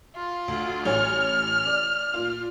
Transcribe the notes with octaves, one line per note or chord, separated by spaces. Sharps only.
F4
D2
A1 C#5 G#5 F6
D5
A#2 F4